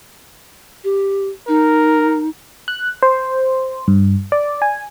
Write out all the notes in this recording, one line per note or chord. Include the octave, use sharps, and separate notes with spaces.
G4
D#4 A#4
F#6
C5
G2
D5
G#5